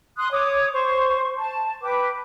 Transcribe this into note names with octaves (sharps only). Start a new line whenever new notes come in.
C6 D#6 F#6
C#5 D6 D#6
C5 C#6
A5
B4 G5 D6